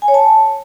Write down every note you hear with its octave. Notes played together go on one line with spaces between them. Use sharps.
G#5
C#5
A5